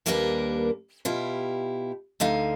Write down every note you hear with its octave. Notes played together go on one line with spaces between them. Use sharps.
D#2 G3 A#3 D4 A#4 B4
B2 E4 F4 G4
D2 D3 D#4 F5